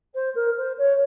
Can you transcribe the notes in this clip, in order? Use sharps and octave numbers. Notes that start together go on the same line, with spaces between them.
C5
A#4
C5
C#5